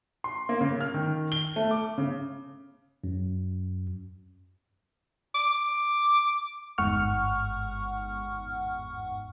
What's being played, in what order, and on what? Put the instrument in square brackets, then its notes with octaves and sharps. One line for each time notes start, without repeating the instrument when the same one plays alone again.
[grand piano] C6
A#3
C#3
F6
D#3
G7
A3
D6
C#3
[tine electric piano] F#2
[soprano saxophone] D6
[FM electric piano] G1 E2 G#2 F#5 C#6 F6